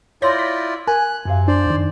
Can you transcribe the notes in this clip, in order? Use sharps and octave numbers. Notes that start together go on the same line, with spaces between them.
E4 F4 C#5 D5 C6 G6 A#6
B6
A#4 G#5 F#6
F#2 C3 F5
D4 C5 D5
F2 D#3